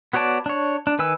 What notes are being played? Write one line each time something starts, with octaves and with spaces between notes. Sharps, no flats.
B3 F#4 C#5 D5 A5
D4 C#5
D4
D#3 B4 G#5 E6